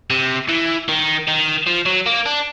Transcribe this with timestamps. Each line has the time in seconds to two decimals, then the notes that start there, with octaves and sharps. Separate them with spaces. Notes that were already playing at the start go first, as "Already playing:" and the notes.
0.10 C3
0.49 E3
0.89 D#3
1.28 D#3
1.67 F3
1.86 F#3
2.06 A#3
2.26 D4